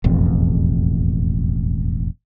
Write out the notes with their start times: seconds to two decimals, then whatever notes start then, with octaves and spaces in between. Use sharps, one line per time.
0.04 E1 A1 F2